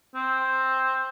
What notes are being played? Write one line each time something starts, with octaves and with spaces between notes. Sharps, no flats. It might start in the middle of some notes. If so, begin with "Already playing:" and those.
C4